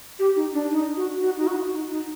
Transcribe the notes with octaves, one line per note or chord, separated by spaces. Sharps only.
G4
D#4
D4
D#4
F#4
F#4
D#4
F#4
D#4
D#4